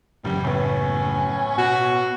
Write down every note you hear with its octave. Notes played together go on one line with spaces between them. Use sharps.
A1 F#2 C#3 G3
A2 B3 C#4
B2 F#4